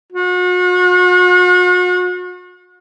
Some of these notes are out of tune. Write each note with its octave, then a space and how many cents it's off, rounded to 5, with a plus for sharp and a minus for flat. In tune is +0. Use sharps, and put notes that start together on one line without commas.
F#4 -40